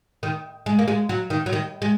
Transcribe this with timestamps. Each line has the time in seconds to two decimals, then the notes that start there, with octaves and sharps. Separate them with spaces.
0.23 D#3
0.66 G#3
0.79 A#3
0.88 G#3
1.09 F#3
1.30 D#3
1.46 F#3
1.53 D#3
1.82 G#3